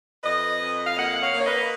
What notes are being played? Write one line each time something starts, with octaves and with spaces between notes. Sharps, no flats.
F2 B4 D#5
F2
F5
A#3 D#5 F#5
F#5
C#5 F5
A#3
C#5
B4 D#5